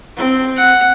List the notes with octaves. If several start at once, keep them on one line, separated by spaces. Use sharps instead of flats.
C4
F#5